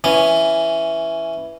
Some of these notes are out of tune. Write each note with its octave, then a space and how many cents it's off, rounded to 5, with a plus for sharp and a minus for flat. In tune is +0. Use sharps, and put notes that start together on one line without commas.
E3 +0 C#4 +0